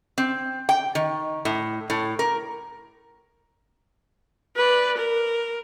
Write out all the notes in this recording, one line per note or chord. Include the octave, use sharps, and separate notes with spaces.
C4
G5
D#3
A2
A2
A#4
B4 D5
A#4